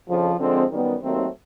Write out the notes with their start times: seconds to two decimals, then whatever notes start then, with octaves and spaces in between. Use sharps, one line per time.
0.08 F2 C#3 F3
0.40 D3 F3 G#3 C4
0.71 F#2 D#3 G3 B3
1.02 D#2 D#3 F#3 A3 C4